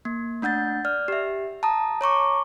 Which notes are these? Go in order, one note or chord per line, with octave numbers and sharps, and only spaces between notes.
A#3
A3 D4 F#5 G6 A6
D5 F6
G4 E5
A5 A#5 D#6
C#5 A#5 C#6 D6